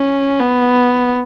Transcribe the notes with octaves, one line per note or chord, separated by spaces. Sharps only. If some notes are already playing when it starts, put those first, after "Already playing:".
Already playing: C#4
B3